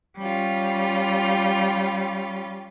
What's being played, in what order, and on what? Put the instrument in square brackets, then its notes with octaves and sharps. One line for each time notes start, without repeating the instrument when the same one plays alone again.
[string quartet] G3 C#4 F4